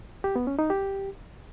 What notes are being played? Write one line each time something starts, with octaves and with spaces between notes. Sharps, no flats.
G4
B3
C#4
D#4
G4